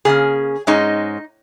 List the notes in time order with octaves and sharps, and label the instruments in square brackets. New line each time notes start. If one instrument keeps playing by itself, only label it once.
[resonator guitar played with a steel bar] C#3 A#3 C#4 G#4
G#2 G#3 C#4 D#4